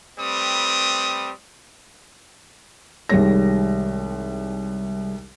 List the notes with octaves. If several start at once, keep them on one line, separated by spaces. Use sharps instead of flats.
G3 A3 C4 B4 D#6
C2 D#3 G3 G#3 C#5 A#6